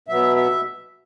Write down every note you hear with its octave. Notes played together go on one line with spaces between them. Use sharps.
B2 F#3 B3 E5
E5